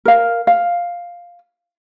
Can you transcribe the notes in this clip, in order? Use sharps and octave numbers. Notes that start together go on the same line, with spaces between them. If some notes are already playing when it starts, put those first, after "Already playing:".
A#4 F5
F5